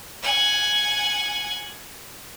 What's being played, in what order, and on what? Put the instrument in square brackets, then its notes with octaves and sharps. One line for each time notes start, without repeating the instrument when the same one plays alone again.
[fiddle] F#5 G#5